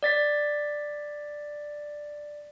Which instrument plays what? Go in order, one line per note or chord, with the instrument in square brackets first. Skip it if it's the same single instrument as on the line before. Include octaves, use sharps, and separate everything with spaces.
[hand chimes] D5 A6 B6